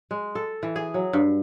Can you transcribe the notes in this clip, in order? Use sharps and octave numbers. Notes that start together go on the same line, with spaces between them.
G#3
A4
E3
G#4
F#3
G2